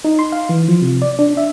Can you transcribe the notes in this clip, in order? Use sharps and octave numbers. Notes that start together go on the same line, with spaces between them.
D#4
C6
F5
E3
F3
C3
D5
D4
E5